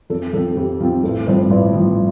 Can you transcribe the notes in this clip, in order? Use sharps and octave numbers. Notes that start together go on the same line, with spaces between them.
F2 A4
F3 C4 A4
F2 G4
F3 C4 F4
A1 A4
G2 F3 C4 C5
A1 D5
G2 F3 C4